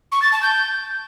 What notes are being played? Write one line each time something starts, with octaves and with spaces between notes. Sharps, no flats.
C#6
A6
A5
G6